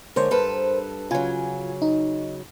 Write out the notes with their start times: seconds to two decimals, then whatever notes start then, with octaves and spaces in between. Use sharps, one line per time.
0.16 D3 G#3 A#4 C5 C#5
0.31 G2 A4 B4
1.11 C#3 F#3 F4 G#5
1.82 D#4